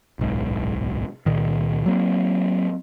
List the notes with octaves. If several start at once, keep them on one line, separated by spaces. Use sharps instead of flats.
D1 B1 G#2
C#2 A#2 D#3
F#3 A#3 C4